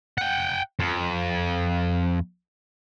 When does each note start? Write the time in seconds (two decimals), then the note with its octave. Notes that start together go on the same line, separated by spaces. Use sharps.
0.18 F#5 G5
0.80 F2